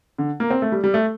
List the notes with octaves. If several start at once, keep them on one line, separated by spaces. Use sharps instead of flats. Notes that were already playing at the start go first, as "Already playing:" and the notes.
D3
A#3
C4
A3
G3
G3
A3